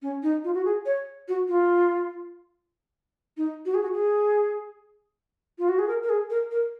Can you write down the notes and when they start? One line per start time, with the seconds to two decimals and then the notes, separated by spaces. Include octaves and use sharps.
0.02 C#4
0.23 D#4
0.44 F4
0.54 F#4
0.65 G#4
0.86 C#5
1.28 F#4
1.48 F4
3.37 D#4
3.65 F#4
3.74 G#4
3.83 F#4
3.93 G#4
5.59 F4
5.69 F#4
5.79 G#4
5.88 A#4
6.03 A#4
6.09 G#4
6.30 A#4
6.51 A#4